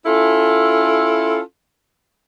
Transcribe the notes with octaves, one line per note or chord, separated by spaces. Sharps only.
C#4 E4 F4 A4